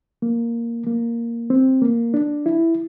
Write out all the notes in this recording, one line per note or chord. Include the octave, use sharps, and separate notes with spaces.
A#3
A#3
C4
A#3
D4
E4